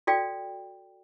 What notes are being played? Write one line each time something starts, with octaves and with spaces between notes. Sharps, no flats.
F#4 A4 D5 F5 G5